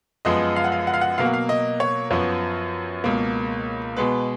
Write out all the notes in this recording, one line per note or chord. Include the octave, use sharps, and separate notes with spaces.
F#2 F3 G#3 B3 D#5
F5
F#5
F5
F#5
F5
F#5
B2 F#3 A#3 F5
F#5
F5
D#5
C#5
F#2 F3 B3 C#5
C#2 B2 A#3
B2 G#3 B3 B4